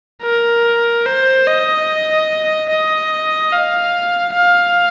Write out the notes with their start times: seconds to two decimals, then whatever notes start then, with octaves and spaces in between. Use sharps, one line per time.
0.23 A#4
1.06 C5
1.47 D#5
2.70 D#5
3.52 F5
4.35 F5